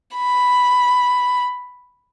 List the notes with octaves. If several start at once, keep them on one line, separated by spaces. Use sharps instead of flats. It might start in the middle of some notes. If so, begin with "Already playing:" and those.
B5